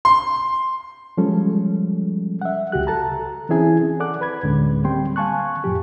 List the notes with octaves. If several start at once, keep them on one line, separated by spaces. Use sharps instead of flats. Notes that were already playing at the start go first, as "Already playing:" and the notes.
C6
F3 G3 G#3 C#4 A4
E5 F#5
C#2 F#4 G4 F#6
A4 A5 A#5
E3 C4 C#4 E4 G#4 G#5
A4 D5 F#5 D6 F#6
B4 B5 G#6
D2 A2 D3 G#3 C#4
G3 A#3 C4 G5 C6
F5 G#5 A5 C#6 F#6
F2 A2 F3 G4